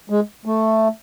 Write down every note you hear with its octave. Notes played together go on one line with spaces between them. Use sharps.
G#3
A3